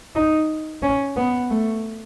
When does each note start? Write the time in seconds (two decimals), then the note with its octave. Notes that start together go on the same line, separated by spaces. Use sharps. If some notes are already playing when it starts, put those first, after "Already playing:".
0.16 D#4
0.82 C#4
1.17 B3
1.51 A3